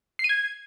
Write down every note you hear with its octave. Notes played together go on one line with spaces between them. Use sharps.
C7
D#7
G#6